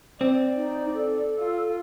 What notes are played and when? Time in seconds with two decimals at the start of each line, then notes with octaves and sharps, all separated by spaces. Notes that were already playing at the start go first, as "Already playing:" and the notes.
0.21 C4 D5
0.56 D#4
0.94 A4
1.39 F4